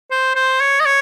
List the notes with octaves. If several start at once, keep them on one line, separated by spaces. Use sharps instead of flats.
C5
C5
C#5
D#5
C#5